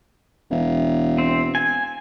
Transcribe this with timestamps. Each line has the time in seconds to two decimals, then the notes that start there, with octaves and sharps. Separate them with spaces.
0.51 E1
1.18 C4
1.55 G#5